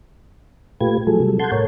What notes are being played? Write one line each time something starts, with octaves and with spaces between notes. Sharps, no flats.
A#2 A3 F4 G4 B4 G#6
F3 F#3 A3 G#4 A4
C3 F#3 G3 A4
A4 F#5 A5 C6 G6 G#6
A2 A#4 C#5